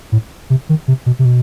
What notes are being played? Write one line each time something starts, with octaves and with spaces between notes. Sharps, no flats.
A2
C3
D#3
C3
B2
C3
B2